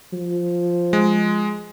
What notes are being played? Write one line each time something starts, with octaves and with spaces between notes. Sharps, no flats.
F3
G#3